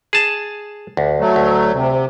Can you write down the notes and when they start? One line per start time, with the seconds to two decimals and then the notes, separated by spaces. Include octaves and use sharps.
0.13 G#4 A5
0.97 D2
1.20 F#3 A3
1.36 D2
1.74 C3